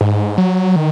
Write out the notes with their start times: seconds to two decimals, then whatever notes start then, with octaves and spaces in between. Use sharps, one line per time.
0.01 G#2
0.38 F#3
0.76 D#3